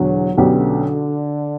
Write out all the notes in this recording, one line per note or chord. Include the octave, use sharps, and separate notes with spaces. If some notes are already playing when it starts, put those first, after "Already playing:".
Already playing: E1 E2 D3 F#3
B1 B2 D3 F#3 C#4 G4